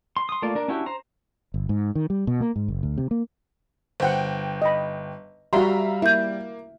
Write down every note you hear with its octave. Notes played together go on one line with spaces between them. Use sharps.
C6
C6 D#6
A3 A#3 F4 D5
D4 A#4
C#4 D4 E4 F#4 G4
C5 A#5
G1
G#2
D#3
G3
B2
A#3
G#2
F#1
D2
C3
A#3
G1 C5 F#5 G5
D#5 B5
G3 F#4 E5 F5 A#5 C6
A#3 E4 E5 G6